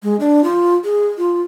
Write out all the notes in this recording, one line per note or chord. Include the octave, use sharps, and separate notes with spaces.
G#3
D4
F4
G#4
F4